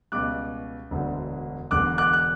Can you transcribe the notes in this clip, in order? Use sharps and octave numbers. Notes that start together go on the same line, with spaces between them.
C#2 B2 G3 D6 F#6
E1 D2 D3
E1 E2 D3 D6 F#6
D6 F#6
F#6